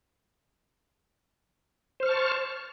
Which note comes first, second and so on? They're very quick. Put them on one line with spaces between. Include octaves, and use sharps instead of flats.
C5 F6 C#6 A5